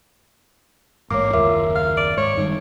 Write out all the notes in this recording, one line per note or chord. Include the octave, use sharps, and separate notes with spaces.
A1 G#2 A#3 C#5 D6
F#1 D#2 F4 A#4 E5
F5
D5
G#2 C#5
G2 D#3 D#4